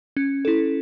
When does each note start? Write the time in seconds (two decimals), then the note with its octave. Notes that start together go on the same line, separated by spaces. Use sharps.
0.17 C#4
0.45 E4 A4